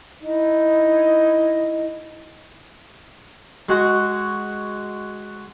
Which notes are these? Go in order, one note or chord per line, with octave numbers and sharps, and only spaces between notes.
D#4 E4 D#5
G#3 F#4